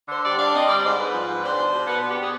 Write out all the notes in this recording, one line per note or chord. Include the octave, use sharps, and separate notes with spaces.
D3 C5
G3 D5
D4 F5
C4 D#5
G3 D5
D5
G#2 C5
G#2 B4
F3
G#2
D4 C5
B2
B2
B3 B4
D4
G4
B3 G#4